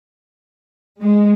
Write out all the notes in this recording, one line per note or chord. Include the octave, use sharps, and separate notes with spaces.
G#3